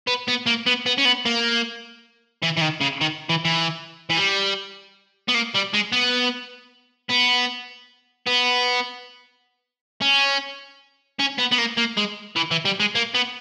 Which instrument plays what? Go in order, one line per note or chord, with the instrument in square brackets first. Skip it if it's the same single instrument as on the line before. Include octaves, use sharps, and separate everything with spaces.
[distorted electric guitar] B3
B3
A#3
B3
B3
C#4
B3
A#3
E3
E3
D#3
C#3
D#3
E3
E3
E3
G3
B3
A#3
G3
G#3
B3
B3
B3
C#4
C#4
B3
B3
A#3
A#3
G#3
E3
E3
G3
G#3
A#3
B3